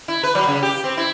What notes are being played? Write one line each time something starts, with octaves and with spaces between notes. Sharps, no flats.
E4
B4
F#3
C#3
G4
C4
E4